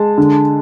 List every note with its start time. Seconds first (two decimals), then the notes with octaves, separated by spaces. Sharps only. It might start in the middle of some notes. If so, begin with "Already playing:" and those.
Already playing: G#3 A5
0.18 D3